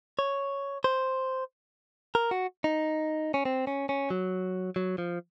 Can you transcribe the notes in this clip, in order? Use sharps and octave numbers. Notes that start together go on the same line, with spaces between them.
C#5
C5
A#4
F#4
D#4
C#4
C4
C#4
C#4
F#3
F#3
F3